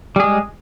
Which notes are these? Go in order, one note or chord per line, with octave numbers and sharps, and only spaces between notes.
G3 G#3 G#4